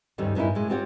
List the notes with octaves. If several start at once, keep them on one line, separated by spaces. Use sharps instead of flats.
D2 G2 D3 D#3 G3 C#4
G2 A#2 C#4 D#4 E4
A2 G#3
C4 F4 G4 C#5 F#5